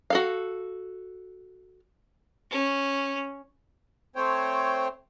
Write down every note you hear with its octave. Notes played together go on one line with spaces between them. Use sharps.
F#4 A4 F5
C#4
A3 C4 C5 C#5 G5